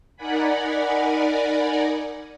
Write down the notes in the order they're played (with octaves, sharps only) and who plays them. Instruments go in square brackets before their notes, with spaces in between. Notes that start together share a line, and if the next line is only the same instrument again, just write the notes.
[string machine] D#4 A#4 D5 F#5 G#5 B5